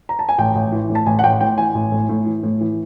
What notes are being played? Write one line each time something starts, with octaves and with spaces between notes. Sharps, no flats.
A#5
A5
G#5
A1 G5
A1
E3
A2
A5
A1 G#5
F#5
A1 G5
A2 G5
E3 G#5
A1
A2
A2
E3
A2
E3